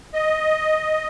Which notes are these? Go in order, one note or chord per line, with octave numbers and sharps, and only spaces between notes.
D#5